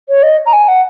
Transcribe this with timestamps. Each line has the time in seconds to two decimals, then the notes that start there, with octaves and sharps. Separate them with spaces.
0.09 C#5
0.23 D#5
0.46 A#5
0.53 G#5
0.68 F#5